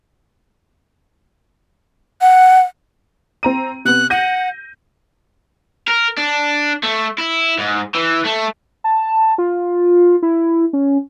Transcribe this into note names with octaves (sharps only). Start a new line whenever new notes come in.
F#5
C4 A#5 D#7
C3 B3 F#6
F#5 G6 A#6 D#7
A#4
D4
A3
E4
G#2
E3
A3
A5
F4
E4
C#4